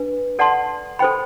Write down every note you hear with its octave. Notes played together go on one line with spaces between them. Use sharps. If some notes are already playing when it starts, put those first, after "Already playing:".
Already playing: D4 B4
A4 D5 F#5 A5 C6
A4 C5 G5 B5